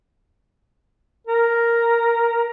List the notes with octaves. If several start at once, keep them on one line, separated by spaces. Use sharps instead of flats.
A#4